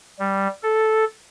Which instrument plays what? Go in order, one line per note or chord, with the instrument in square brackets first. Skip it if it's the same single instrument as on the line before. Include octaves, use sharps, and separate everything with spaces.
[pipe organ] G3
A4